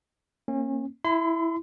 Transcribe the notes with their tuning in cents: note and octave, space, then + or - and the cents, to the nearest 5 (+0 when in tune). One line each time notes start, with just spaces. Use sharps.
A#3 +0 C#4 -30
E4 +0 C6 -40